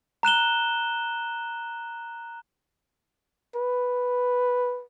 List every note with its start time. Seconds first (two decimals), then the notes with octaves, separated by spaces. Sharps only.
0.23 A#5 F#6 E7 G7
3.56 B4